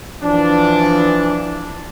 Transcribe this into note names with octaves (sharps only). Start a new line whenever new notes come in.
E3 F3 D4